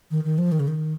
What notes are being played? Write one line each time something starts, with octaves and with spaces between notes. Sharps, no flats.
D#3
D#3
F3
D#3
C#3
D#3